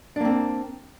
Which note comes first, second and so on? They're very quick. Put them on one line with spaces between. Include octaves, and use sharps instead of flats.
D4 A#3 C4